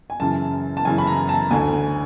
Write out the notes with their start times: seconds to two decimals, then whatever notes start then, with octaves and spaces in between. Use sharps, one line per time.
0.10 G#5
0.20 F#2 C#3 E3 A5
0.77 A5
0.85 F#2 C#3 E3 G#5
0.98 B5
1.07 A#5
1.29 A5
1.51 D2 D3 G#5